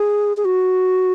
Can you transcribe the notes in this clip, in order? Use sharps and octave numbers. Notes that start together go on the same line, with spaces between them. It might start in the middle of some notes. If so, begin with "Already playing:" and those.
Already playing: G#4
G#4
F#4